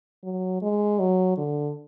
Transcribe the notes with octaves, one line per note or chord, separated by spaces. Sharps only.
F#3
G#3
F#3
D3